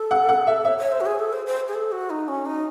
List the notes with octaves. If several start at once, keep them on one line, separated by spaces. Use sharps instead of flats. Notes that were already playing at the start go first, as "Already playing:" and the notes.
Already playing: A4
F#5
F#5
E5
C#5 E5
C#5
C5
F#4
G#4
A4
C5
C5
G#4
A4
F#4
D#4
C#4
D#4